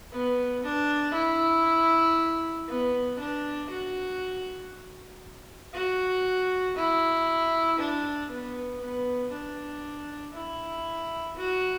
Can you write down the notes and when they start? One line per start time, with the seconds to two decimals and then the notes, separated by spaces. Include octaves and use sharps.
0.11 B3
0.63 D4
1.15 E4
2.68 B3
3.19 D4
3.70 F#4
5.74 F#4
6.77 E4
7.79 D4
8.30 B3
8.81 B3
9.32 D4
10.34 E4
11.36 F#4